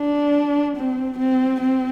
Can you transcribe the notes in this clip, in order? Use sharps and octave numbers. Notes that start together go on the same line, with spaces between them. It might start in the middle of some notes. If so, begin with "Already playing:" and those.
Already playing: D4
C4
C4
C4